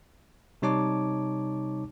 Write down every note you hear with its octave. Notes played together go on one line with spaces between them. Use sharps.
C3 G3 D#4 C#5 A5 D6